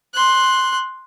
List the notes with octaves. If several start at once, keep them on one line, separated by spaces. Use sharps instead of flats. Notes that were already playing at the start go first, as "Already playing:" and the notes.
C6 F#6